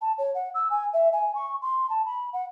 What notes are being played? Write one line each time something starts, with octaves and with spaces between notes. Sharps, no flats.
A5
C#5
F#5
E6
G#5
E5
G#5
C#6
C6
A5
B5
F#5